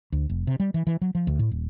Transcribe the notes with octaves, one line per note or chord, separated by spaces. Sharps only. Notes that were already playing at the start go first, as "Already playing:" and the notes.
D2
F1
C3
G3
E3
E3
F#3
F3
D2
A2
D#1